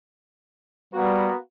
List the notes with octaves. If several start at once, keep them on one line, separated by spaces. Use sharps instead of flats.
G3 A#3 B3 F#4